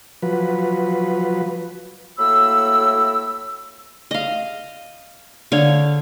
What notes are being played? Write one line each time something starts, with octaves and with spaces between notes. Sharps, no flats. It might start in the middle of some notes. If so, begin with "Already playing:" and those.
F3 F#3 B4
A2 F#3 A#3 B5 E6
D#5 F5
D3 C#5 F5